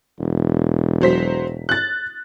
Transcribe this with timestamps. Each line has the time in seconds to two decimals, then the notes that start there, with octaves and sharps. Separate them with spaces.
0.19 E1
1.01 F#3 C5 B6
1.69 F#6 A6